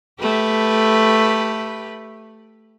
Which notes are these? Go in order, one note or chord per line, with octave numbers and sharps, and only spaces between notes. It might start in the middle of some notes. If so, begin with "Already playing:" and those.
A3 G4 B4